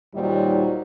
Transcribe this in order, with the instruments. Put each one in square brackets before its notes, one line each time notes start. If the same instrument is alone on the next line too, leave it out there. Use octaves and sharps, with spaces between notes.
[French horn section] D#2 A#2 F#3 G3 D#4 C5